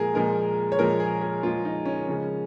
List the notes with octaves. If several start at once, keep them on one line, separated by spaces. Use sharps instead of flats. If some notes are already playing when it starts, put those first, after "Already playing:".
Already playing: A#2 F3 G#3 G#4 A#4
A#2 F3 G#3 A#4
C#5
A#2 F3 G#3 A#4
G#4
G#4
A#2 F3 G#3 F4
D#4
C#4
C#3 F3 G#3